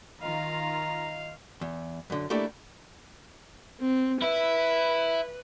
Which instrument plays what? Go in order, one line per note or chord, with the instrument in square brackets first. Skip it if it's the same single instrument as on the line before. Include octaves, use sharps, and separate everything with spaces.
[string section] D#3 F4 [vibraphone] D#5 [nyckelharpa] F5 [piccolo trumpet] A#5
[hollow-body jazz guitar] E2
F#2 D3
A3 A#3 D4 E4 G4 A4
[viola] C4
[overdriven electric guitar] E4 E5 [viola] B4